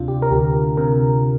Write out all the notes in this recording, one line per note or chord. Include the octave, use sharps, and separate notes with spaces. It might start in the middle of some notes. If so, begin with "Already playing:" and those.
Already playing: D2 C3 D4 F4
G4
A#4
D2 G4
C3 A#4